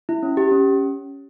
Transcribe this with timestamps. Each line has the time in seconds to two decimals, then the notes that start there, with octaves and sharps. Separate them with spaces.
0.09 E4
0.23 C#4
0.37 G4
0.51 C#4